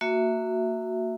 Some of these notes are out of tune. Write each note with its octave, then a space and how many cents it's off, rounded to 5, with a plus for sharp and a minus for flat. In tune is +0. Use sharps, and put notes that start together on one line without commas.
A#3 -30 F#4 -5 E5 +0